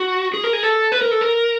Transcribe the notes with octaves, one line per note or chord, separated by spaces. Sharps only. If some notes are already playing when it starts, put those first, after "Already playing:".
Already playing: F#4
G#4
A#4
G#4
A4
B4
A#4
A4
A#4